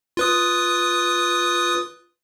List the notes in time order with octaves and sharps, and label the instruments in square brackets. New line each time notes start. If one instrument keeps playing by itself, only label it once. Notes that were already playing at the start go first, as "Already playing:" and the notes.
[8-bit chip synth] F4 B4 D#6